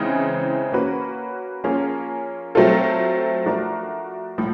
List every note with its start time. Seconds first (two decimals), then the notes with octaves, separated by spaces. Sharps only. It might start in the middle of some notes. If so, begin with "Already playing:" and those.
Already playing: C#3 E3 G#3 C4 D#4
0.72 A#3 C#4 F#4 B4
1.64 F3 A#3 C#4 F4 G#4
2.55 F#3 A3 C4 F4 A4
3.46 F3 A3 D4 F#4 A#4
4.38 A2 F3